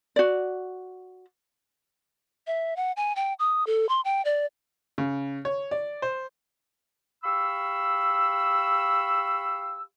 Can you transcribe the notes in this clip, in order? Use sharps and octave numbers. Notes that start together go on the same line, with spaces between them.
F#4 D5
E5
F#5
G#5
G5
D#6
A4
C6
G5
D5
C#3
C#5
D5
C5
G4 F5 B5 C#6 E6